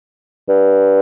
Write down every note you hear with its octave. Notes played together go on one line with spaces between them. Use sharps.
G2